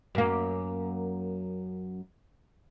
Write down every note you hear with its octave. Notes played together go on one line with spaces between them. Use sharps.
F#2 A#3